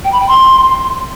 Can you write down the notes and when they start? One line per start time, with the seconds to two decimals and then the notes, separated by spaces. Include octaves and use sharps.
0.04 G5
0.12 B5
0.20 G5
0.28 C6